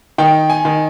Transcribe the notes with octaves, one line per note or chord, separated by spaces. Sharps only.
D#3 G5
G#5
D#3